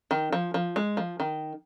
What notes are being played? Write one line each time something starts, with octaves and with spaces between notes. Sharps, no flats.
D#3
F3
F3
G#3
F3
D#3